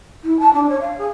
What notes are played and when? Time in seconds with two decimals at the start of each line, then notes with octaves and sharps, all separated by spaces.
0.23 E4
0.39 A5
0.54 D4
0.69 C#5
0.81 F5
0.98 G#4